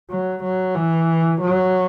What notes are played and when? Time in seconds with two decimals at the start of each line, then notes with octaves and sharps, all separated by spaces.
0.10 F#3
0.44 F#3
0.75 E3
1.41 F#3